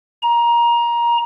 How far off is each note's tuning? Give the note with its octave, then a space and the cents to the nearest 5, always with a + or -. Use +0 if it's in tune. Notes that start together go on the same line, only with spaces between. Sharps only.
A#5 +20